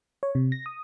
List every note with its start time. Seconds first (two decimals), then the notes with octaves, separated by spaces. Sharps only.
0.23 C#5
0.35 C3
0.52 A#6
0.66 D#6